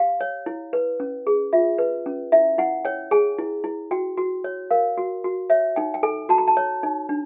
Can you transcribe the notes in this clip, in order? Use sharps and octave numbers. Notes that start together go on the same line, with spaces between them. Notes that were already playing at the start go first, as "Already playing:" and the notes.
Already playing: G4 F5
C#5
E4
B4
C#4
G#4
F4 E5
B4
C#4
E4 E5
E4 F#5
C#5 G5
G#4 G#5
E4
E4
F#4 G5
F#4
C#5
A#4 F5
F#4
F#4
C#5 E5
D#4 G5
G5
A4 G#5
F#4 A5
A#5
A5
C#5
D#4
D4